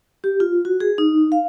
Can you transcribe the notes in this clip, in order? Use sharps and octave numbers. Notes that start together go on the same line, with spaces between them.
G4
F4
F#4
G#4
D#4
F5